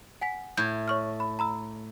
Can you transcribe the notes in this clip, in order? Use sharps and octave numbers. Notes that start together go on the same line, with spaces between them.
F#5 G#5 B6
A2 G6 G#6
C#5 C#6 F6
B5
A#5 B5 E6